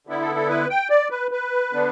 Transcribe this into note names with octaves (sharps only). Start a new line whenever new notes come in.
D3 B3 E4
A4
A4
B4
G5
D5
B4
B4
D3 B3 D4